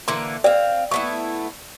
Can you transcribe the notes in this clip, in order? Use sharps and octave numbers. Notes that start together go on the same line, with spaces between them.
D3 E3 A#3 C6
C4 D5 F5 G5
A3 B3 E4 C#6